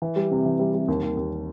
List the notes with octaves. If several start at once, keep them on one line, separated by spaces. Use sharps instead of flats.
E3
G3
C3
E3
G3
G3
D#2
D#2
D#2